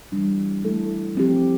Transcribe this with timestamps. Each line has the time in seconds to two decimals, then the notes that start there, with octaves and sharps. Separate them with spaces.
0.12 E3 G3 D4
0.63 E3 A3 E4 A4
1.15 F3 C4 G4